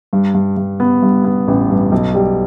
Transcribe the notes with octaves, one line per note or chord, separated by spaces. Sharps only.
G2
G2
G2
B3
G2
B3
A1
G2
B1
G3